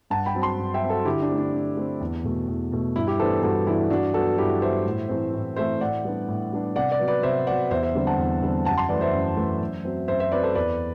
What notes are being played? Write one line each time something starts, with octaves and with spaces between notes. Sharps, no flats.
G2 F#5 A5
G5 B5
F#3 C4
A5 C6
G2
E5 G5
F#3 C4
F#4 A4
D3 E4 G4
D4
A3 C4
D4
D3
A3 C4
E2
B2 A3
E2
B2 A3
G2 E4
E4 G4
E3 B3 D4 A4 C5
G2 F#4 A4
E3 B3 D4 E4
G2 D4 F#4
F#3 B3 F#4 A4
G2 E4 G4
F#3 B3 C5 E5
A2
E3 A3 C4
A2
E3 A3 C4 C5 E5
A2 D5 F#5
G3 B3 D4
A2
G3 B3 D4
C3 D5 F#5
D5 F#5
F#3 B3
B4 D5
C3 C5 E5
F#3 B3 D5 F#5
E2 C5 E5
C5 E5
D3 G3 C4
F#5 A5
E2
D3 G3 C4
F#2 F#5 A5
A5 C6
E3 A3 B4 D5
C5 E5
F#2
E3 A3
F#2
F#3 C4
F#2 C5 E5
C5 E5
F#3 C4 B4 D5
A4 C5
E2 B4 D5